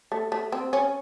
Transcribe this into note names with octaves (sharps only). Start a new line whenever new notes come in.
A3
A3
C4
C#4